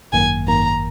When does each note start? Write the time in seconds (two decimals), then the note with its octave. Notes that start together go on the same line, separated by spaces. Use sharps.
0.13 G#1 F#2 D#3 A#3 G#5
0.48 G#1 F#2 D#3 A#3 A#5